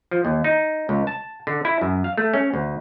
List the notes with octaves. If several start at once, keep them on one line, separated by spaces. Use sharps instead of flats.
F3
D#2
D#4
C#2
A5
D3
E4
F#2
F5
A3
C#4
D2